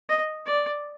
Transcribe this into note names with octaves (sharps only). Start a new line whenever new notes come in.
D#5
D5